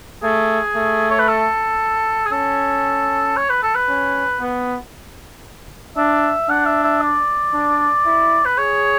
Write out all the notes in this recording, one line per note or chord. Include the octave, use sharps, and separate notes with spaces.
A3 G#4
A3
C#5
B4
A4
G#4
C#4 A4
C#5
B4
A4
B4
C#4
B3
D4 E5
D4 F#5
E5
E5
D5
D4
E4
B4
G#4 C#5